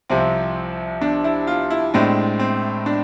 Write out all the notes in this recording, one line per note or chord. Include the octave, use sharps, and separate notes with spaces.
C2 C3 F3 C4
D4
E4
F4
E4
A2 G#3 C4 D4
C4
D4